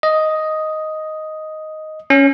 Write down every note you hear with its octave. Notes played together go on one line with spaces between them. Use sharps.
D#5
C#4